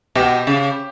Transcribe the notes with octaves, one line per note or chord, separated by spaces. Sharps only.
B2 G4
C#3